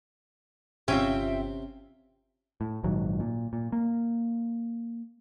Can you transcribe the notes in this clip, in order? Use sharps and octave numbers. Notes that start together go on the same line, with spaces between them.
G1 G2 C3 C4 C#4 F4 E5 G5
A2
A#1 G#2 D#3 F#3
A#2
A#2
A#3